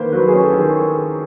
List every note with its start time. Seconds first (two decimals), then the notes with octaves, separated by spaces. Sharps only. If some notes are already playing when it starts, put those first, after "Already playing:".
Already playing: D#3 A#3 B4 C5
0.12 F#3 B4
0.28 G#4
0.34 C#4
0.43 A4
0.53 D#3
0.59 G#4